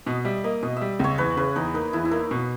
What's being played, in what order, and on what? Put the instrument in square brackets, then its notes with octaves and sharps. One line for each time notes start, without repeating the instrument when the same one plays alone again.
[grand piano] B2 [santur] D#5
[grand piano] G3 [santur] E5
[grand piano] A#3 [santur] D#5
[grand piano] B2 [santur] D#5
[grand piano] G3 [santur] E5
[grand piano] C#2 [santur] C#5
[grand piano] E2 [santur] B4
[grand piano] C#3 [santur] B4
[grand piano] E2 [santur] D#4
[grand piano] A#3 [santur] D#4
[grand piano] E2 [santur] E4
[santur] E4
[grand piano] A#3 [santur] D#4
[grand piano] B2